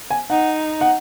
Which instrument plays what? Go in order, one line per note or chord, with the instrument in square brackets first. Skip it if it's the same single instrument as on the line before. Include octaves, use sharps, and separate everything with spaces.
[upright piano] G#5
[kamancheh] D#4 [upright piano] F#5
[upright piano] F#5